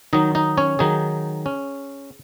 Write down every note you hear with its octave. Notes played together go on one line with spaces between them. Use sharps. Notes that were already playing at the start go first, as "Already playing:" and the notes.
D#3 F#3 D#4 D#5
D#4 D#5
C#4 C#5
D#3 F#3 D#4 G#4
C#4